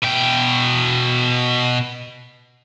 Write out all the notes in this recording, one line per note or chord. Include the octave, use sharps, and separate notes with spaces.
B2 G5